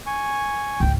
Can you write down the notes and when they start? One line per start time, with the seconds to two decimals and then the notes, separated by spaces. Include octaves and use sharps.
0.06 G#5 C#6
0.80 G#1 C#2 G5